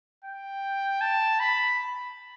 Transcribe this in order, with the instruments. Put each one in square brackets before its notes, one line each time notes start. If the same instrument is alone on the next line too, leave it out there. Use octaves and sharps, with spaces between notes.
[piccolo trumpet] G5
A5
B5